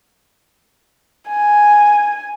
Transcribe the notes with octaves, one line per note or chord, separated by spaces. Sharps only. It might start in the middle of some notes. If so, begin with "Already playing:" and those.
G#5